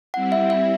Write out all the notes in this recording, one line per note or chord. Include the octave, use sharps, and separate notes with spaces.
G3 C4 E4 F#5
E5
E5